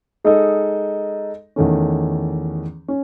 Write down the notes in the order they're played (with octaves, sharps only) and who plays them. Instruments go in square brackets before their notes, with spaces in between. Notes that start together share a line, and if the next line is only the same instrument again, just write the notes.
[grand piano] G#3 D#4 A4 D#5
E2 D#3 A3 C#4
C#4